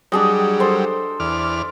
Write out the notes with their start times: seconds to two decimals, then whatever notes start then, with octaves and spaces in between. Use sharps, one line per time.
0.12 F#3 G3 D4 G#4 D#5
0.60 A4 C5
1.20 E2 D5 F6